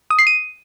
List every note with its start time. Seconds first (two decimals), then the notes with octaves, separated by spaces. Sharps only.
0.11 D#6
0.19 C7
0.27 D#7